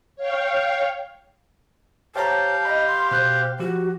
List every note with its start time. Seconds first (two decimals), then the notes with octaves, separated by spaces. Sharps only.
0.16 C#5 F5 G5
2.16 G4 C5 C#5 F5 G5 A5 A#5
2.65 D#5 B5
2.86 C6
3.11 B2 C5 F#6 G6
3.60 F3 F#4 G4